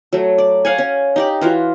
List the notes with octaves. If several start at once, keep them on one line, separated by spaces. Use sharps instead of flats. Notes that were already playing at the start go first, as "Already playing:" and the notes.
F#3 A3
D5
C#5 F5 F#5 G#5
C#4
D#4 G4 D5
E3 F4 F#4